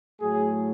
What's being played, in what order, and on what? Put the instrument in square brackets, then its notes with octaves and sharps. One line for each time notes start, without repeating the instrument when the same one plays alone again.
[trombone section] A2 F#3 A3 G#4